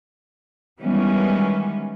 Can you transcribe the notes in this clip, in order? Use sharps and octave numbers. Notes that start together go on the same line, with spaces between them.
D#3 E3 G3 G#3 B3 C#4